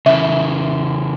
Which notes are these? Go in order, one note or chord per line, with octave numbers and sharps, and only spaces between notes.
C#3 E3 E5